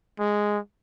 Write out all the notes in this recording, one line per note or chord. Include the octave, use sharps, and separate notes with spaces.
G#3